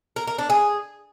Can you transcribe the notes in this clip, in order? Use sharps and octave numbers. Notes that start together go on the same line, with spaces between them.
A#4
A#4
D4
G#4